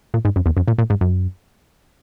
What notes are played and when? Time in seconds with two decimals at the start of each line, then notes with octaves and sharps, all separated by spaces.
0.14 A#2
0.25 G#2
0.36 F#2
0.46 E2
0.57 F#2
0.68 A#2
0.78 A#2
0.90 G#2
1.01 F#2